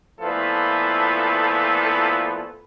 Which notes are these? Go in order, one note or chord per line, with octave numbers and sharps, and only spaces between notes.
A#2 F3 A3 B3 E4 A4